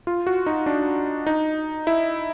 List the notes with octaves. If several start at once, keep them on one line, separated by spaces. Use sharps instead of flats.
F4
F#4
D#4
D4
D#4
E4